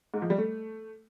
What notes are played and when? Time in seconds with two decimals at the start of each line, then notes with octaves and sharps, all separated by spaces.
0.14 G#2
0.22 F3
0.30 G3
0.38 A3